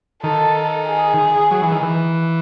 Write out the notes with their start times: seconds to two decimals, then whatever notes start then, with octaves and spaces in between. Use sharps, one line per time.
0.23 D#3 A4
0.87 G#4
1.51 F#3
1.62 E3
1.72 D#3
1.83 E3